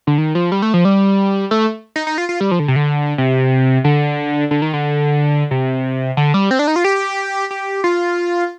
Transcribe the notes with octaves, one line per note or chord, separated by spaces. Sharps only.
D3
D#3
F3
G3
A3
F3
G3
A3
D#4
D#4
F4
F4
G3
F3
D3
C3
D3
C3
D3
D3
D#3
D3
C3
D3
G3
C4
D4
D#4
F4
G4
G4
F4